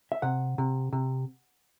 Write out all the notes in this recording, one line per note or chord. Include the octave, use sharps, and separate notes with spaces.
E5
C3 F#5
C3
C3